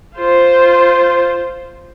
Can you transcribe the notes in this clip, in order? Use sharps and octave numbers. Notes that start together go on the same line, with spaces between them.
F4 C5